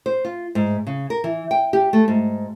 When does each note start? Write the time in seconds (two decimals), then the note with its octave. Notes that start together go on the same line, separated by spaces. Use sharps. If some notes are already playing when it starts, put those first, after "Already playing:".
0.06 C5
0.25 F4
0.55 G#2
0.87 C#3
1.10 A#4
1.24 E3
1.51 G5
1.73 G4
1.93 A3
2.08 G#2